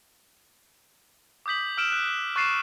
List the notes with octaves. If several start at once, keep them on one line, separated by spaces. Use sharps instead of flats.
D6 D#6 G6 B6 F#7
E6 F6 D7 E7
F#6
C#6 F#6 A6 C7 D#7 E7